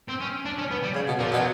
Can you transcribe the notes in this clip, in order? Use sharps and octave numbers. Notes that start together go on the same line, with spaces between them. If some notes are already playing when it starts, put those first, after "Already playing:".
C4
C#4
D4
C#4
B3
G3
C#3
B2
A#2 F3
B2 F#3